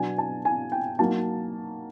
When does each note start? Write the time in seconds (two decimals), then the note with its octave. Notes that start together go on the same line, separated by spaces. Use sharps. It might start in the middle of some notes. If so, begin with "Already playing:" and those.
Already playing: B2 F#3 B3 D4 G#5
0.18 A5
0.45 G#5
0.72 G5
0.99 F#3 A#3 D#4 A5